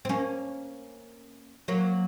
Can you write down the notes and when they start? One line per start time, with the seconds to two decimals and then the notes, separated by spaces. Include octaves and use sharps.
0.05 C4
0.09 A#3 C#4
1.68 F#3 A#3